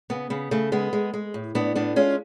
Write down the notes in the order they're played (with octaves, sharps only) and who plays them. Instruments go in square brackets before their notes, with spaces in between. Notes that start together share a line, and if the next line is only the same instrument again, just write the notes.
[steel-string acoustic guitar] C#3 B3
C#3 B3
C#3 A3
G#3 B3
G#3
G#3
A2
A2 B3 D4
A2 B3 D4
G#3 C#4 F4